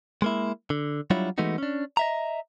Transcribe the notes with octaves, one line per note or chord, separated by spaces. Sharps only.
G#3 A#3 E4
D3
F#3 G3 D4 E4 F4 C#5
E3 G#3 A3 B3 D#4 F#4
C#4 D4
D#5 E5 A#5